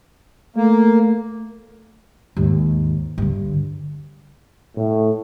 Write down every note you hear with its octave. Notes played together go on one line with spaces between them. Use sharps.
A3 A#3
D#2 G#2
G2 D3
A2